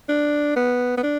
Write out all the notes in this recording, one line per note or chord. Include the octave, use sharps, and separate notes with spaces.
D4
B3
B3
D4